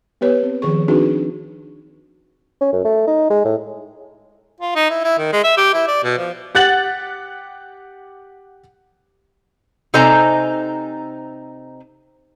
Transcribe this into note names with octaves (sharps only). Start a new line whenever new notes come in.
B3 G4 B4 C#5
C4
D#3 F3 G#4 C#6
C4 D4 D#4 F#4 G#4 B4
C#4
F#2
A3
D#4
G#3
A2
F4
D#4
E4
E4
D#3
G#3
E5
G4
E4
D5
B2
F3
G4 F#5 F#6 A6 F#7
C3 D#4 A4 C5 G#5 A#5